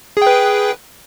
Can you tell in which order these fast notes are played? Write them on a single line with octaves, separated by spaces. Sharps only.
G#4 G5 B4